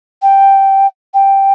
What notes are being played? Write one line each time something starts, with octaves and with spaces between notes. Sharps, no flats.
G5
G5